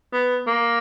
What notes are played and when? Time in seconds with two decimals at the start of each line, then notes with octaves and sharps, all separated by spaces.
0.13 B3
0.47 A#3